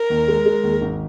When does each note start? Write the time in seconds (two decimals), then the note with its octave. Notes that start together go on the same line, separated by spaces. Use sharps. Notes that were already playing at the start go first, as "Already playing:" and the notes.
Already playing: A#4
0.10 D#2
0.28 G#3
0.46 G#3
0.63 D#2
0.81 G#1